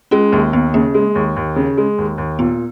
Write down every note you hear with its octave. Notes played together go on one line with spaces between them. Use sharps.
G#3 C#4 F4
D#2 A#3
D#2 B3
C#3 A#3
G#3
D#2
D#2
C#3
G#3
D#2
D#2
A#2 B3